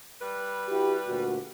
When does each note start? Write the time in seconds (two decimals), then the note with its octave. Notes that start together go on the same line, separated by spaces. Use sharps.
0.21 G3 B4
0.69 E4 F#4 G4
1.07 D2 A#2 F#4